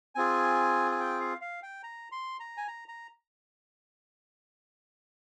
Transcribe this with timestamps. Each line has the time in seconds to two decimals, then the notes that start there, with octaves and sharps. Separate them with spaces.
0.15 C4 F4 G#4 G#5
0.91 G#5
1.00 G5
1.21 F5
1.41 F5
1.63 G5
1.83 A#5
2.12 C6
2.40 A#5
2.57 G#5
2.68 A#5
2.88 A#5